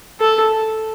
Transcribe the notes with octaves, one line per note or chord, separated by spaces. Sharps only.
A4